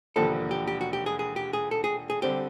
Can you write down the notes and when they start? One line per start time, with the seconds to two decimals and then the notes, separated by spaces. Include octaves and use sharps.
0.16 E1 D#2 D3 F3 A4
0.51 G4
0.67 G4
0.81 F#4
0.93 G4
1.06 G#4
1.19 G#4
1.36 G4
1.53 G#4
1.71 A4
1.84 G#4
2.10 G#4
2.22 D3 G3 C4 G4